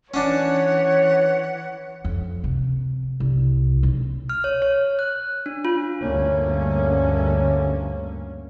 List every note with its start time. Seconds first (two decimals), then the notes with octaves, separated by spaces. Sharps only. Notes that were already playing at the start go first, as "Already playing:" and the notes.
0.14 E3 C#4 D4 C#5 F#5
2.05 F2
2.44 C3
3.20 C2
3.83 B1
4.29 F6
4.44 C#5
4.62 C#5
4.99 F#6
5.46 D4
5.65 F4
6.02 D2 G2 D3 A#3 C#4